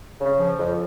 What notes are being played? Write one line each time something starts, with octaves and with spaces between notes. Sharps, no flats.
C#3
F3
F2